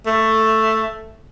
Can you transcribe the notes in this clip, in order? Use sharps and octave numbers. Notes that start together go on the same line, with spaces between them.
A3